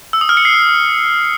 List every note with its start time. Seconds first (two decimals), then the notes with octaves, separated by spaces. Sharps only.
0.13 E6
0.21 D#6
0.29 F6
0.37 C#7
0.45 C7